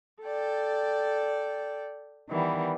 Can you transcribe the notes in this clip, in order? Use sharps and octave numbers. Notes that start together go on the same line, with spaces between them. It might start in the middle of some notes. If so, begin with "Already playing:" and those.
A4 D5 G5
D#3 E3 G3 B3